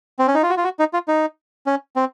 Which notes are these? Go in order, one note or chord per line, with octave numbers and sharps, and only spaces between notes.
C4
C#4
D#4
F4
F#4
F4
F#4
D#4
F4
D#4
C#4
C4